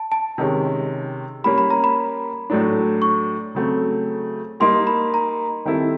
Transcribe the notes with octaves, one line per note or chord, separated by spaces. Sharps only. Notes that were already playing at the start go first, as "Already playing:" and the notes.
Already playing: A5
A5
C3 D#3 G#3 C#4
G3 A#3 C#4 B5
B5
A#5
B5
A2 F#3 A3 D4
C#6
C#3 F#3 A3 C4
G3 A#3 D#4 C6
B5
A#5
D#3 G3 C4 E4 A4